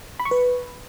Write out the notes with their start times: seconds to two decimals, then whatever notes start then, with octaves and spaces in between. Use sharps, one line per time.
0.20 B5
0.25 C#6
0.31 B4